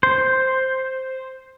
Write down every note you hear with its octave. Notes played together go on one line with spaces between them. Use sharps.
C5